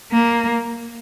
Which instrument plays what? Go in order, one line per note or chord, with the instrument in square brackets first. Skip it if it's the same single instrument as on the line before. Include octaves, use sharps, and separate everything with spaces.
[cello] A#3